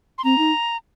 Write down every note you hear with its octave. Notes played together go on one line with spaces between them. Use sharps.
C6
C4 A#5
D#4